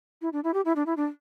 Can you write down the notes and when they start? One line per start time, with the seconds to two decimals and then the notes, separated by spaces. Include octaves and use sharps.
0.22 E4
0.33 D4
0.44 E4
0.54 G4
0.65 E4
0.76 D4
0.86 E4
0.97 D4